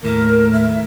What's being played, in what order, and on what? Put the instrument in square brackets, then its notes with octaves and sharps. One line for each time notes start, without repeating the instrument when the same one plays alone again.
[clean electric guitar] D#2 A2 A3 [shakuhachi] A#4
[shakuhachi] E5